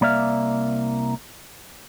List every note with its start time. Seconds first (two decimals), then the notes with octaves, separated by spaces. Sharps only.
0.01 C2 A#3 D5 E5 F5